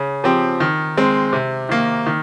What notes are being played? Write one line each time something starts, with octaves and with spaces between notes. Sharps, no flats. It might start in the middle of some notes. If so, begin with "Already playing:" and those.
Already playing: C#3
F3 C4 G4
D#3
G#3 C4
C3
D#3 A#3
D#3